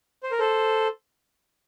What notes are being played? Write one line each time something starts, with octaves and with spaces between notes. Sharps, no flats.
C5
A#4
A4 C5